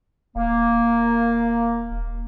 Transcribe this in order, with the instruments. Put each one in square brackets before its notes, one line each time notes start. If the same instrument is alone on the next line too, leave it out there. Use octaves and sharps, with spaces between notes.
[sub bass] D#1 [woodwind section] A#3